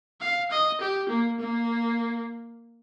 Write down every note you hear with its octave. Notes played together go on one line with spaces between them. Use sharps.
F5
D#5
G4
A#3
A#3